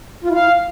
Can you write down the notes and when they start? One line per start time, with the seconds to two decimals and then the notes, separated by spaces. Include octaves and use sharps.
0.24 F4
0.29 E4
0.34 F5